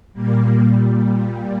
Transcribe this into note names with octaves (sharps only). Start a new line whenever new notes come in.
A#2 G3 A#3